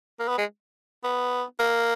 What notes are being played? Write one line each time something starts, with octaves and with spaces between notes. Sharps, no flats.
A#3
B3
G#3
B3
A#3